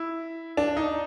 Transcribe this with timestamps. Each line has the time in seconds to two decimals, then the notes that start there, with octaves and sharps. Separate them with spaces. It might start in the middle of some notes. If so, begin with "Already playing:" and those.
Already playing: E4
0.57 D4
0.77 D#4